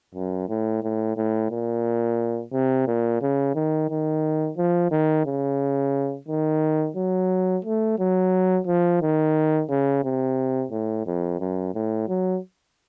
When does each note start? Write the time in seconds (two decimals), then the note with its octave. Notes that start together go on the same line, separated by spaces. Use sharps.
0.15 F#2
0.49 A2
0.83 A2
1.17 A2
1.51 A#2
2.53 C3
2.87 A#2
3.22 C#3
3.55 D#3
3.90 D#3
4.57 F3
4.91 D#3
5.25 C#3
6.28 D#3
6.96 F#3
7.64 A3
7.99 F#3
8.66 F3
9.01 D#3
9.69 C#3
10.04 C3
10.71 A2
11.06 F2
11.40 F#2
11.74 A2
12.08 F#3